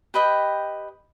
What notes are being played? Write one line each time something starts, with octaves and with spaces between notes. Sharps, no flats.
G4 B4 D#5 G5